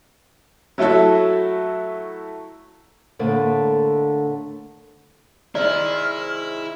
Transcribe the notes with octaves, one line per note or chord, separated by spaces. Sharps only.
F#3 A3 E4 F#4 A4 E5
A2 D3 A3 A#3
C3 D#3 G#3 E4 D5 F6